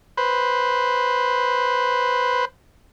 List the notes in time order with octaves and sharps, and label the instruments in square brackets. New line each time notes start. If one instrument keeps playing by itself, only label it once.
[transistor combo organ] B4 C5